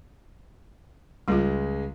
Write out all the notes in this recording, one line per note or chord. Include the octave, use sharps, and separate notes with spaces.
C#2 G3 G#3 F4